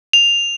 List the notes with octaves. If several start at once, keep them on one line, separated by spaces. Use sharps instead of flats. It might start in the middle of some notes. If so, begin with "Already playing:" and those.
F7